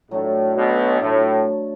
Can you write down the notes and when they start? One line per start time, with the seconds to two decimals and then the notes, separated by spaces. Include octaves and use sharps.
0.11 A2 F#3 A3 D4 A4
0.56 B1 B2
1.01 A2 F#3 A3 D4 A4